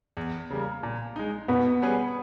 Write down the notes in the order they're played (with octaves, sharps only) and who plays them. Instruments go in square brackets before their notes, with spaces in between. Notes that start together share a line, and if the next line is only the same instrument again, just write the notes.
[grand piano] E2
C#3 G3 A#3
A#2
G#3 D#4
[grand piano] B2 [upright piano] B3
[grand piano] G3 C#4 G#4 B4